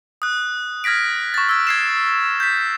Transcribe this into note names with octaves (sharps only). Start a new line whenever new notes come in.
D#6 F#6
F6 G#6 A#6 B6 D7
C#6 A6
E6 G#6
G#6 C7 E7
G6 B6